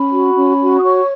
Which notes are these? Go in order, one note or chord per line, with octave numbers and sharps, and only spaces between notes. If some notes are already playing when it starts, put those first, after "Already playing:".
Already playing: C#4 B5
F#4
C#4
F#4
D#6
C#5 C#6